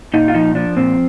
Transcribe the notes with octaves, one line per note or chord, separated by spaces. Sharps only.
A#2 D#4
F4
F3 D#4
F3 D4
A#2 C4